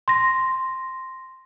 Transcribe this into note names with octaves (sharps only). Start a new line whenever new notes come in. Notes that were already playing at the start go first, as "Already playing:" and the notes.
C6 A#6